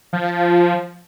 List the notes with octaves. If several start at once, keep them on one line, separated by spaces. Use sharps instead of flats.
F3